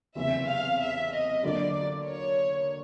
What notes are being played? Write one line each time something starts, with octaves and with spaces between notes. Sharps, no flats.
F#1 E2 C3 E5
F5
E5
D#5
D3 F#3 A#3 D4 D5
C#5